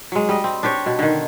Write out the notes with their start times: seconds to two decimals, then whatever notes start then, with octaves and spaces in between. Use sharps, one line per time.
0.12 F#3 G#3
0.29 G3 D#5
0.44 C4
0.63 D4 G4 C5 C#5
0.86 B2
0.99 D3 D#3